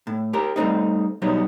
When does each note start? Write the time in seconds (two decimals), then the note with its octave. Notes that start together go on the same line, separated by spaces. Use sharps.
0.07 A2
0.33 G4 A#4
0.56 G3 A3 C4 D#4
1.22 B2 F#3 G3 B3 D#4